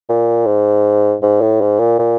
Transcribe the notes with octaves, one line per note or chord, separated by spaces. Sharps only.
A#2
G#2
G#2
A2
G#2
A#2
A#2